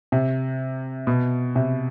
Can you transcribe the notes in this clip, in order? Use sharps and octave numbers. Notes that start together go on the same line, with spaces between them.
C3
B2
C3